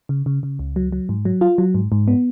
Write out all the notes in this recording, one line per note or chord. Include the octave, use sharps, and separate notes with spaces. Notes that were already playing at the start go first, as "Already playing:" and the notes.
C#3
C#3
C#3
C#2
F#3
F#3
G#2
F#3
F4
F#3
G#2
G#2
B3